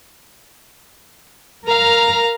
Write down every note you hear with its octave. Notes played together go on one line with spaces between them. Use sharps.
A#4 F5 A#5